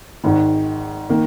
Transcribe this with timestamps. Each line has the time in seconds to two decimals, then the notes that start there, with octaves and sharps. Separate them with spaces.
0.24 G#1 G#2 D#3
1.10 D#3 A#3